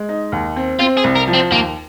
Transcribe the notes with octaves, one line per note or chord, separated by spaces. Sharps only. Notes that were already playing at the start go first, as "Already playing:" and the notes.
Already playing: G#3
D#4
D#2
C4
C4 F4
G#4
C2
A#4
F3
C4
D#2 A#3